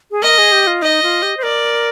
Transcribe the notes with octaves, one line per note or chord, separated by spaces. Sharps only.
G#4
A#4 D#5
G#4
G4
F4
D#4 D#5
F4
G4
C5
A#4 D5